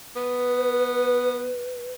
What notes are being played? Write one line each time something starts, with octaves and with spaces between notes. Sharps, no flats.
B3 B4